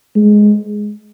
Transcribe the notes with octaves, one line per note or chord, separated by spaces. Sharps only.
G#3